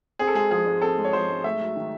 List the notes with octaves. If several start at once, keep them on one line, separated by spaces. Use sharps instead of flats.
C4 G#4
A4
G#3 G#4
F3 G#4
G#2
C4 A4
G#3
C#5
F3 C5
G#2
A3 E5
F#3
D#3